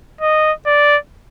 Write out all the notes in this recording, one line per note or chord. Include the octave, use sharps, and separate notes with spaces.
D#5
D5